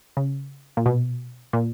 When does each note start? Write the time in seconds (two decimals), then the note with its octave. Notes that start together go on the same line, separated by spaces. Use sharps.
0.17 C#3
0.77 A#2
0.86 B2
1.53 A#2